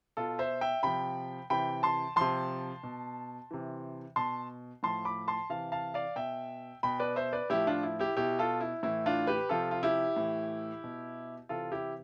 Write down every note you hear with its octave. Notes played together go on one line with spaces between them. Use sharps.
B2 F4 A4
C5 E5
E5 G5
C3 F3 G5 B5
C3 E3 G5 B5
A5 C6
C3 F3 A5 C6
B2
C3 E3
B2 A5 C6
A2 F3 A5 C6
B5 D6
A5 C6
C3 E3 F5 A5
F5 A5
D5 F5
B2 E5 G5
B2 G5 B5
B4 D5
C5 E5
B4 D5
A2 F3 E4 G4
D4 F4
E4
E4 G4
B2 E4 G4
F4 A4
E4
A2 E3 E4
D4 F4
G4 B4
C3 F3 F4 A4
F4
E4 G4
A2 E3
B2
C3 E3 F4 A4
E4 G4